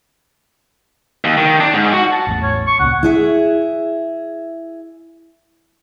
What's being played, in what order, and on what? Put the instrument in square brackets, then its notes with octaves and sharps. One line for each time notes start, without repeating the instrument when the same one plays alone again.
[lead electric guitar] D#2
D#3
D4
G#2
F#4
[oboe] A5
[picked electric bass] A1 E2 A2
[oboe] C#5
C#6
[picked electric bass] C#2 A#2 [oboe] F#5
[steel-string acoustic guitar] E4 G#4 E5